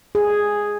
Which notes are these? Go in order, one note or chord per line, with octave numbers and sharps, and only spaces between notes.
G#4